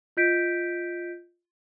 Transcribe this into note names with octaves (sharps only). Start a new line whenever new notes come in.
F4 D#5 G6 B6 D7